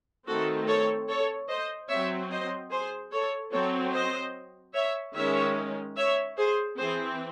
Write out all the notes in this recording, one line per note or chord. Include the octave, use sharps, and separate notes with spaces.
D#3 A3 C4 F#4 A4
A4 C#5
A4 C#5
C5 D#5
F#3 C4 C#5 E5
C5 D#5
G#4 C5
A4 C#5
F#3 C4 A4 C#5
C5 D#5
C#5 E5
D#3 G#3 C#4 C#5 E5
C#5 E5
G#4 C5
E3 C4 G#4 C5